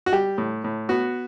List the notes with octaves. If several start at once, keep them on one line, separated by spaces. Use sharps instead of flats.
F#4
G3 G4
A2
A2
B3 F#4